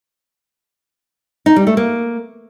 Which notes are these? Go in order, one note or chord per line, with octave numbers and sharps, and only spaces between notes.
D#4
G3
A3
A#3